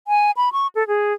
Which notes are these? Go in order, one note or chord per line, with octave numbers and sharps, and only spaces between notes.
G#5
B5
C#6
A4
G#4